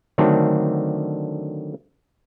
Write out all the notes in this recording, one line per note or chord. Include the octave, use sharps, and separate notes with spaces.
D3 D#3 F#3 A3 C4 D4